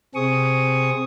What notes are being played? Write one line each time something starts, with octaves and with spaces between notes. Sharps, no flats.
C3 C4 G#4 C#6 D#6